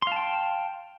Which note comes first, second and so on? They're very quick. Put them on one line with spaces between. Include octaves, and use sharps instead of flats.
C6 F5 A5 G5